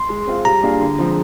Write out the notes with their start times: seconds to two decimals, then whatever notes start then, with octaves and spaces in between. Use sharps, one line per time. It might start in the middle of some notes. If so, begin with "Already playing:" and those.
Already playing: C6
0.09 G#3
0.27 C4 F4
0.45 G3 A#5
0.63 A#3 D4 F4 G#4
0.81 D3
0.99 F3 G#3 C4